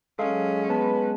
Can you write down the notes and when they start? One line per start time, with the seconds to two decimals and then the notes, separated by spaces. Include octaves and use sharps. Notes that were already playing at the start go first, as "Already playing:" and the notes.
0.19 F#3 G#3 C#4 A4 F5
0.69 B3 B4 A5